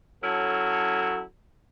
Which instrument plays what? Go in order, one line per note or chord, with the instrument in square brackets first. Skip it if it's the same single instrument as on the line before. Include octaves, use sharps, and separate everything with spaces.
[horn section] F#3 C#4 E4 A4